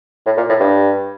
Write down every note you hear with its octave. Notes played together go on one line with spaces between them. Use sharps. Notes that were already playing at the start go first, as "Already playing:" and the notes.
A2
A#2
A2
G2